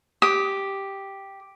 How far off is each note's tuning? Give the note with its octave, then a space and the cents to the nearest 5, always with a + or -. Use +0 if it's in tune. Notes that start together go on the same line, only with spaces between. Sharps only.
G4 +0 D#6 +15